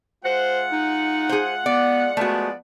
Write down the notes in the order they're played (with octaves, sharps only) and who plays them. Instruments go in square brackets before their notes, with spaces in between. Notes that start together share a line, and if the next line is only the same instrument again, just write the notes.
[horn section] G#3 F4 F#5 [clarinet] C5
[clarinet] D#4
[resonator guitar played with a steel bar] G#4 C5
[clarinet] B3 [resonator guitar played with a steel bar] D5
[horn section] F3 G#3 B3 [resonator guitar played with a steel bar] A3 F#4 [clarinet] D5